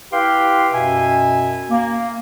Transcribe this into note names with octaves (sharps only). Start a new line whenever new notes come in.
E4 G4 B4 F5 G5 C6
F#2 B2 E5 G#5
A#3